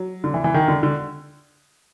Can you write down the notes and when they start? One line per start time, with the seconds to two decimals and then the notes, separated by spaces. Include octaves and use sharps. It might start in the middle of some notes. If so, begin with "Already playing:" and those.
Already playing: F#3
0.24 D3
0.34 E3
0.44 E3
0.54 D#3
0.68 D3
0.83 D3